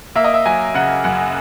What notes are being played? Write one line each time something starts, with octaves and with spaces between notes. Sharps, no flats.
A#3 E5
D#5
E5
F#3 G#5
C#3 F#5
F#2 F#5